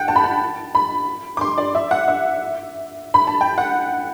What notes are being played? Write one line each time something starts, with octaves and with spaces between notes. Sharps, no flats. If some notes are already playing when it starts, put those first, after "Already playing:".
Already playing: F#5 G5
A5
B5
A5
B5
D6
C6
D5
E5
F#5
E5
B5
A5
G5
F#5